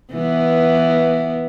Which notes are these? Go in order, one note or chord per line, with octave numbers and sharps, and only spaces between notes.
E3 B3